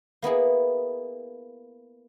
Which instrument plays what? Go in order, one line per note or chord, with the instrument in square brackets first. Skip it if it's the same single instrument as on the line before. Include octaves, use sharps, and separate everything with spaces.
[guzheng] A#3 B3 E4 G#4